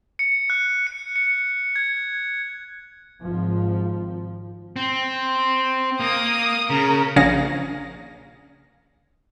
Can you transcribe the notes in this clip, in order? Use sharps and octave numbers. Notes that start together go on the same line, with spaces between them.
C#7
F#6
C#7
C#7
G#6
G#1 F3
C4
A#3 D#6
C#3 A#4
A#1 C#3 G#4 C#5 F5 A#6